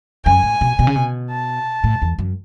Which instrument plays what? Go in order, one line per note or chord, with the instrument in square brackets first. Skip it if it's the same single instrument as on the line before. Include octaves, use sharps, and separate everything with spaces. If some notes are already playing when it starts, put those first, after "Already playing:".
[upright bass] F#2 [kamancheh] G#5
[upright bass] A2
B2
B2
C#3
B2
[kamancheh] A5
[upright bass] A2
E2
F#2